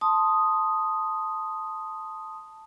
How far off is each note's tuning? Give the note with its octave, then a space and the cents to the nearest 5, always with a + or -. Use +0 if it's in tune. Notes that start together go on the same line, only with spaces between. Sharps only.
A5 +0 C6 +0 D#6 +0